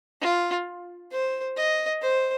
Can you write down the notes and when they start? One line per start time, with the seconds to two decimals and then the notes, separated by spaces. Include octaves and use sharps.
0.21 F4
1.11 C5
1.56 D#5
2.02 C5